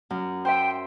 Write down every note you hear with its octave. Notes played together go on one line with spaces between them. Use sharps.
F#2
C5 E5 G5